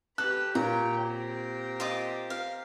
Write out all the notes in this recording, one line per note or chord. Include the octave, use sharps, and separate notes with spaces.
G4 A4 B4 F#6
A#2 G4 C#5 G5 A#5
C4 G4 A#4
F4 D#5 D6
F5